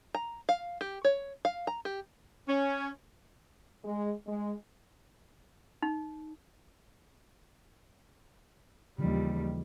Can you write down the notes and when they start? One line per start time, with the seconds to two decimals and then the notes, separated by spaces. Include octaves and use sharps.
0.15 A#5
0.49 F5
0.81 G4
1.05 C#5
1.45 F5
1.67 A#5
1.85 G4
2.49 C#4
3.85 G#3
4.27 G#3
5.82 D#4
8.98 D#2 C#3 E3 F3 G3